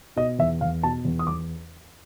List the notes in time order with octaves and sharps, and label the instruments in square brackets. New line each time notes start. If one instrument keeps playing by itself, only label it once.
[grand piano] B2 D#5
E2 E5
E2 F5
B2 A5
E2
D#6
E2 D6